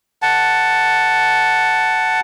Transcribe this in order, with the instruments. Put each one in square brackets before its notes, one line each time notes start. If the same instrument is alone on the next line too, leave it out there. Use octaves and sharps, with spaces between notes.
[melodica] F#5 A5